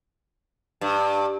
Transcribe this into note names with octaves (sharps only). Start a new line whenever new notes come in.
G2